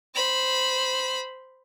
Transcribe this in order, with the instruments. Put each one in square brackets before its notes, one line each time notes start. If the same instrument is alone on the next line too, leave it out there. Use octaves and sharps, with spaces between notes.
[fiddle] C5 B5